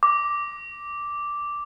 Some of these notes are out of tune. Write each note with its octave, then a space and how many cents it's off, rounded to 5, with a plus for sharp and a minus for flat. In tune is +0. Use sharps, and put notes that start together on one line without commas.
D6 -5